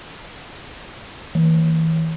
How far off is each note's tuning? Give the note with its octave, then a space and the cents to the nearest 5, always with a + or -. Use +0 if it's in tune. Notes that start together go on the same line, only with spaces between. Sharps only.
E3 -30